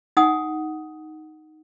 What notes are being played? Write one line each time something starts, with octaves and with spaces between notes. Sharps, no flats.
D#4 F#5 G#5 D#6